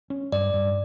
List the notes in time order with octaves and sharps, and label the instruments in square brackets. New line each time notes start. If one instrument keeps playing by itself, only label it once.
[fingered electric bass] C#4
[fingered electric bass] G2 [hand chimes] D5
[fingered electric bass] G2